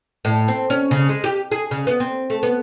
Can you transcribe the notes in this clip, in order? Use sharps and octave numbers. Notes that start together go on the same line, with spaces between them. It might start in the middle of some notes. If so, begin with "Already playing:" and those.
A2
C4
C#4
C#3
G#3
G4
G#4
C#3
B3
C4
A3
B3